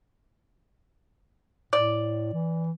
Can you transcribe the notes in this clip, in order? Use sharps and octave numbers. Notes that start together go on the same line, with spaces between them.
A2 D5
E3